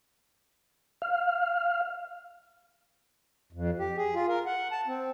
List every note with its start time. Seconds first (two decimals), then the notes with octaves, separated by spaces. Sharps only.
1.02 F5
3.53 F2
3.79 G4
3.97 G#4
4.15 F4
4.29 A#4
4.46 F#5
4.72 A5
4.87 C4